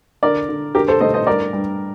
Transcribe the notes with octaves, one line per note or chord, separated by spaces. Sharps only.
D3 A#4 D5
D3
D3 G4 A#4
A4 C5
A3 C5 D#5
C5 D#5
G2 A#4 D5
G2